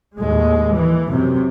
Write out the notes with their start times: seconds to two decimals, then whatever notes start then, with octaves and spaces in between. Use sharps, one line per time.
0.18 D#2 A2 G#3
0.73 E3
1.09 F#2 C3